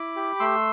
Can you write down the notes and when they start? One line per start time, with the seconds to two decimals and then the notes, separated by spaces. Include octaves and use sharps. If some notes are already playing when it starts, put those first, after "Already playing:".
Already playing: E4 B5 D6
0.16 G4
0.39 A3 C6 E6